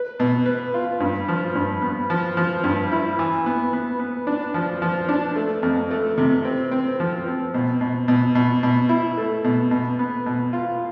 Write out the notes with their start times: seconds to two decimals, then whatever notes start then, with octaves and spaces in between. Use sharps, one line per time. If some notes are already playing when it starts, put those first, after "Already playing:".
Already playing: B4
0.20 B2
0.46 B4
0.74 F4
1.00 G2
1.28 F3
1.55 G2
1.82 B3
2.10 F3
2.37 F3
2.64 G2
2.92 E4
3.19 E3
3.46 B3
3.73 B3
3.99 B3
4.27 D4
4.54 F3
4.82 F3
5.09 D4
5.36 A3
5.63 F2
5.91 A3
6.18 C3
6.45 C4
6.71 C4
7.00 F3
7.26 C4
7.54 B2
7.81 B2
8.08 B2
8.35 B2
8.63 B2
8.89 E4
9.17 A3
9.44 B2
9.71 B2
9.99 B3
10.26 B2
10.53 F4